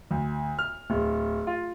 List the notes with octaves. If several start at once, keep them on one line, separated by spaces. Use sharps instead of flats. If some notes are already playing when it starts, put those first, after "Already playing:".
D2
F6
D1
F4